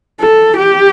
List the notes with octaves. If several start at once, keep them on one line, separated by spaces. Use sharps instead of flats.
A4
G4